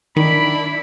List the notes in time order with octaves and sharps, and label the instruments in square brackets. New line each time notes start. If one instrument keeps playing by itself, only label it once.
[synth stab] D#3 [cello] D4 E4 [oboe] B5